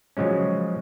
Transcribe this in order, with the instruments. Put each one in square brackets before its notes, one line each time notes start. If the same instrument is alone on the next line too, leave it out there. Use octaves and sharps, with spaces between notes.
[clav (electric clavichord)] C#3 F3 F#3 G#3 C#4